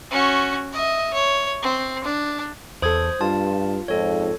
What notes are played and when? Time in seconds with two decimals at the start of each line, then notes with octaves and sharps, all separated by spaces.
0.11 C#4 F#4
0.73 D#5 E5
1.14 C#5
1.62 C4
2.04 D4
2.82 E2 A4 C5 D#6 G#6
3.21 G2 F4 A5
3.88 F2 G#2 A4 C#5